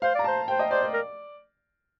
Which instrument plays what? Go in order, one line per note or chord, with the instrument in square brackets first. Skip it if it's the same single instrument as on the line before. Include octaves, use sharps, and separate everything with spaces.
[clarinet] C5 [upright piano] F5
[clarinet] D5 [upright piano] A#5
[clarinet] C5 [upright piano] A5
[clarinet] C5 [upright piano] G5
[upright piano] D#5
[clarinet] C5 [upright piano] D5
[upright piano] D5
[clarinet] A#4